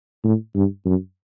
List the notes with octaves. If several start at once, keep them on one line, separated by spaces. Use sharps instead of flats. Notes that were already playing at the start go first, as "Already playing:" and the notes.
A2
G2
F#2